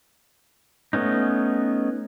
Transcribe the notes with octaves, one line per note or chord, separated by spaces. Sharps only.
A3 B3 C#4 D#4